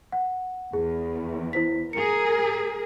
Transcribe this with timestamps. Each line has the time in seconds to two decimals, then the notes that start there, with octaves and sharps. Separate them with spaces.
0.12 F#5
0.73 E2 G#4
1.53 E4 C5 B6
1.93 G#4 A#4 C#7